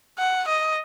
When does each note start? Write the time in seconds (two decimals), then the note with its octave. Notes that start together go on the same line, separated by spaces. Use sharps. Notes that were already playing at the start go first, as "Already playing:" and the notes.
0.19 F#5
0.48 D#5